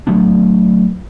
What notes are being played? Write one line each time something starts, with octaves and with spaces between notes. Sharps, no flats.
F#3 A3 B3 D4